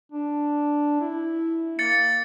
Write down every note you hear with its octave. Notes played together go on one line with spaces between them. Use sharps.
D4
E4
A#3 A6 C#7